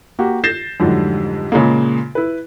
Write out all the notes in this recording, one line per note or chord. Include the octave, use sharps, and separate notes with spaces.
A#3 F#4 G4
G6 A6 A#6 C7 E7
F2 G#2 D3 F#3 G3
A#2 C#3 G#3 A#3
E4 B4